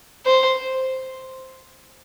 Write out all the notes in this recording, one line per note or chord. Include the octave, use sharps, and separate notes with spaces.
C5